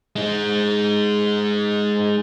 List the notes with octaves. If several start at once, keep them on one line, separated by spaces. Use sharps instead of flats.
G#3 D#4